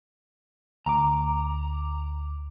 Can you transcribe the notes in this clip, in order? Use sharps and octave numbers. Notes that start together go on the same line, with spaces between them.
D2 A#5 D6